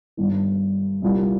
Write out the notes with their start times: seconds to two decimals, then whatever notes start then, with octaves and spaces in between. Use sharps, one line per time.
0.17 G1 G2 D#3
1.02 C2 A#2 G3 A#3 F4